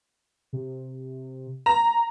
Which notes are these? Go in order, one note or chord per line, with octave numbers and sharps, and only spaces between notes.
C3
A#5